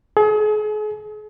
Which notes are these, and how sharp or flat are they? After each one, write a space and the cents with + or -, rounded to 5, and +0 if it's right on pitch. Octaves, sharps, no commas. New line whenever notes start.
G#4 +40